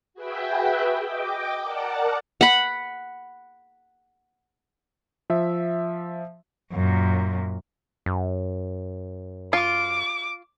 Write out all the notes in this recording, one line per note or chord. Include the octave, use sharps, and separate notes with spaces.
F#4 G#4 B4 E5 G5
D#5 G5 D6
A#4 D5 F#5 A5
F#5 B5
F3 E5
F#2 A#2
F#2
F4 D6